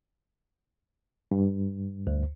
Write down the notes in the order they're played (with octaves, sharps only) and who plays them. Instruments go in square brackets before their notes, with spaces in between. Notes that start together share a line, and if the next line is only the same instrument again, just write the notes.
[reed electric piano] G2
[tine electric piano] D2